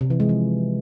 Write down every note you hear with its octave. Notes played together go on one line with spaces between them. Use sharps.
C3
E3
G#3
F3